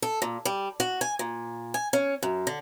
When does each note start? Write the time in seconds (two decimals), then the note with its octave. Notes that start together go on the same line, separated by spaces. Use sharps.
0.02 A4
0.22 A#2
0.45 G3
0.80 F#4
1.01 G#5
1.19 A#2
1.74 G#5
1.93 C#4
2.23 F#2
2.47 D3